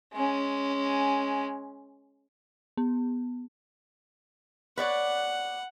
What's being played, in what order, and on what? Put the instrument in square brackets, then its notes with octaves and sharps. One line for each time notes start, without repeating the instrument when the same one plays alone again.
[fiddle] G#3 C#4
[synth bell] B3
[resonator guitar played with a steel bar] B4 C#5 D5 [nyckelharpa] F#5